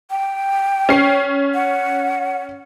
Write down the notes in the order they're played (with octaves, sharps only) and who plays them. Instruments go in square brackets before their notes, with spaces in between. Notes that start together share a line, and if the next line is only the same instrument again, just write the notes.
[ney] G5
[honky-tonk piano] C#4 C7
[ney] F#5